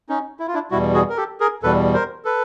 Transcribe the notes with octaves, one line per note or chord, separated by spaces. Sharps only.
C#4 D#4
E4
F4
D4 E4
E2 B2 G3 E4 F#4
F#4 G#4
A#4
G4 A4
G#4 A#4
E2 B2 G3 A4 B4
A#4 C5
A4 B4